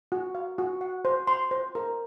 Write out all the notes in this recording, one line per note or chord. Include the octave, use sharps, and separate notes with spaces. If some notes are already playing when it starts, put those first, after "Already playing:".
F#4
F5
F#4
F#5
C5
C6
C5
A#4